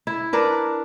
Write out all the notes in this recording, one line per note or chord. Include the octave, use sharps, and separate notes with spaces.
E4
D4 A#4 B4